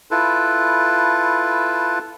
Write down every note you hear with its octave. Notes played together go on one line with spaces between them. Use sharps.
E4 F4 A4 B4